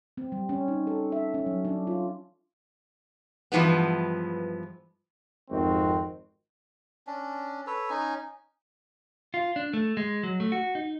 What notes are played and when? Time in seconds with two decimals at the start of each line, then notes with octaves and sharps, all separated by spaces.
0.17 C4
0.32 G3
0.49 C#4
0.68 D#4
0.87 A4
1.12 E5
1.34 C#4
1.46 F#3
1.65 D4
1.87 F4
3.52 G2 E3 F3 G#3 B3
5.51 G#1 F2 D#3 G#3 C4 F#4
7.07 C#4 D4
7.67 A4 B4 C#5
7.90 C#4 D#4 G#5
9.34 F4
9.56 D4
9.73 A3
9.97 G#3
10.23 F#3
10.40 A3
10.52 F#4
10.75 D#4